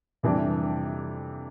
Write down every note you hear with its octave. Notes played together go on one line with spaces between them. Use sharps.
F2 C3 E3 G3 D4